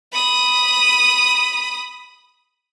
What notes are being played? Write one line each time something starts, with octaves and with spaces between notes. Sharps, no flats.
B5 D#6